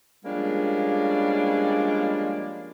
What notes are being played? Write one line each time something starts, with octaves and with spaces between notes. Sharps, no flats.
F3 G3 G#3 A#3 C#4 D4